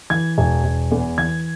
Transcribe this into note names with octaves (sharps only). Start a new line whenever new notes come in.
E3 G#6
E1
E1
E2
E3 G#6